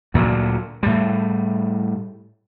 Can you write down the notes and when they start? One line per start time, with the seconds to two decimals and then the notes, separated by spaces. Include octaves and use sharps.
0.14 D2 A#2 F#3
0.83 A2 G3